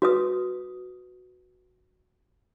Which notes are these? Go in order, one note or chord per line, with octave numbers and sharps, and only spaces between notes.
F#4 B4 D#6